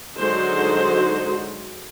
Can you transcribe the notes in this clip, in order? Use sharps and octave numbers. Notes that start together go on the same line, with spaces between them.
D3 F#3 G#3 D#4 F#4 C5